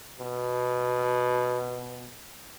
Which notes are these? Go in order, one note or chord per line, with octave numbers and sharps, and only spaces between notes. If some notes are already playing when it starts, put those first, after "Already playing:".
B2